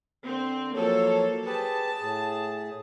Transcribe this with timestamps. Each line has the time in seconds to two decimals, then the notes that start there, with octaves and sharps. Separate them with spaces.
0.25 D3 C4
0.75 F3 F#3 A#3 A4 C#5
1.46 G4 G#4 B4 A5
2.00 A2 G#4